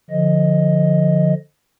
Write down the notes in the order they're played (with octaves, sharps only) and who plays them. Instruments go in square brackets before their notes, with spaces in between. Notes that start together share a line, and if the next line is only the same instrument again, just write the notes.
[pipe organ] D3 F3 D#5